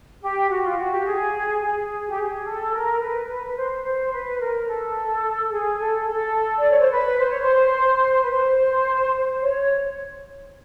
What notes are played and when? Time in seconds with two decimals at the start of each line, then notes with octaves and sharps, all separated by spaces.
0.22 G4
0.49 F#4
0.63 F4
0.77 F#4
0.91 G4
1.05 G#4
1.61 G#4
2.08 G4
2.17 G#4
2.45 A4
2.73 A#4
3.01 B4
3.29 B4
3.46 B4
3.56 C5
3.84 C5
4.12 B4
4.40 A#4
4.68 A4
5.52 G#4
5.79 A4
6.07 A4
6.58 D5
6.69 C#5
6.80 C5
6.91 B4
7.19 C5
7.30 C#5
7.41 C5
8.23 B4
8.31 C5
9.42 C#5